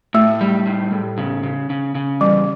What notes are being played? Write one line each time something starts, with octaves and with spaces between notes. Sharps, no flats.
A2 A3
G3
A2
A2
C#3
C#3
C#3
C#3
E2 G3